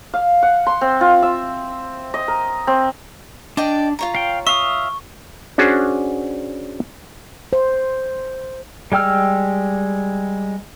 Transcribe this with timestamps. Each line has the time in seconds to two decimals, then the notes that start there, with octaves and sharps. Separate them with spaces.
0.14 F5
0.43 F#5
0.66 C6
0.81 C4
1.01 F4
1.22 E5
2.14 D#5
2.28 A#4
2.67 C4
3.57 D4 D5 D#5 G5
3.99 F4 C#5 A#5
4.15 F5 G5
4.47 E5 F5 C#6 D#6
5.58 C#4 D4 F#4 G#4 C5
7.53 C5
8.92 G3 G#3 G5 E6 F6